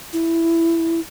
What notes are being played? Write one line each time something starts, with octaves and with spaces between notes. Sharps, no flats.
E4